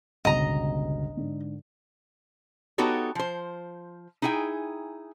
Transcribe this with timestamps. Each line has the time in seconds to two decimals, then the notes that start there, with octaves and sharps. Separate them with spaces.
0.25 G1 C#2 B2 D#5 A#5
1.17 G#2 D3 D4
2.78 B3 D#4 F#4 G4 A4 C#5
3.15 F3 C5
4.22 D#4 E4 G#4 G5 G#5